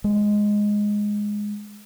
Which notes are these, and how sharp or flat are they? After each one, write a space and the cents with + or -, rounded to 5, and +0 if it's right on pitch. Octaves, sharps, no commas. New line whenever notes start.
G#3 +0